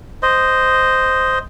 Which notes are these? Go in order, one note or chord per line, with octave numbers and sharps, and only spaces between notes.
C5 D#5